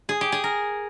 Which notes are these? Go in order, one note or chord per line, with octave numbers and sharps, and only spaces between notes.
G#4
G4
G#4
A#4